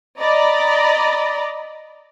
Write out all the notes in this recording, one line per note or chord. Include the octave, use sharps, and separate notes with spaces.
D5 D#5 A#5 B5